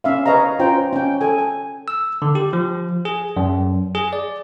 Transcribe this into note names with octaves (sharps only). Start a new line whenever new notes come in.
C#4 E5 F5
B4 C#5 D#5 F5 A#5
C#4 F4 C5 G5 A#5
C#4 G5
A4 G#5
G#5
E6
D3
G4
F3
G#4
F#2
G#4
D5